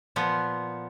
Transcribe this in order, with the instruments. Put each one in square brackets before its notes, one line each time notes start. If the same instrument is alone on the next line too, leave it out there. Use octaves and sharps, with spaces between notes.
[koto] A#2 F3 B3